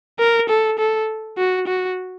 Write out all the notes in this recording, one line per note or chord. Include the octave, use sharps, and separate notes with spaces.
A#4
A4
A4
F#4
F#4